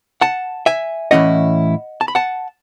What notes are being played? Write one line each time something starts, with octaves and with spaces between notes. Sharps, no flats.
F#5 A5
E5 G#5
A2 E3 A3 C#4 E4 D#5 F#5
A5
B5
F#5 A5